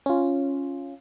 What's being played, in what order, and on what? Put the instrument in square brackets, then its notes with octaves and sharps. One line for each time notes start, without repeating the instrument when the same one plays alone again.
[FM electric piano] C#4 F4